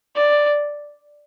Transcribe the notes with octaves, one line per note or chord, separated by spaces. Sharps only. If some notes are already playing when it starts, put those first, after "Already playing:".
D5